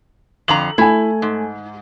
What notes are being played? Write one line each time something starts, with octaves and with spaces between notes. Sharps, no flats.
F2 D3 A#5 F#7
A3 E4 G#5
G#2